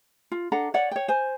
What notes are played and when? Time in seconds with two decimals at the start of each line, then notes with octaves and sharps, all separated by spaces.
0.32 F4
0.52 D4 A4 F#5 A#5
0.74 C#5 D5 F#5
0.91 C#5 G5
1.08 C5 G#5